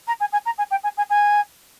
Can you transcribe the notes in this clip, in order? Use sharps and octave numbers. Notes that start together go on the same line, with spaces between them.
A#5
G#5
G#5
A#5
G#5
G5
G#5
G#5
G#5